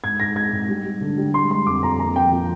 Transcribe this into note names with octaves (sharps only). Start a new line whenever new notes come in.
G#2 G#6
G#2 A#6
G#3 G#6
G#2
G3
G3
D3
G3
G#3 C6
G#3 C6
F2 D6
F2 A#5
A#3 A#5
F3 G5
F3